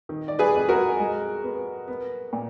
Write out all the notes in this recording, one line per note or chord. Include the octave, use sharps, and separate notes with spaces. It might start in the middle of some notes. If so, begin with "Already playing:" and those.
D#3
D5
G#4 B4
F2
F#4 A#4
G#3
B3
B3
A#2